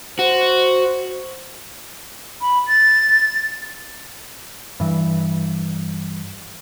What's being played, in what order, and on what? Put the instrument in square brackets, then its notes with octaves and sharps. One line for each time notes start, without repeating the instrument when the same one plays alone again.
[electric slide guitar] F#4 [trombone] C5
[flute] B5
A6
[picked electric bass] G2 E3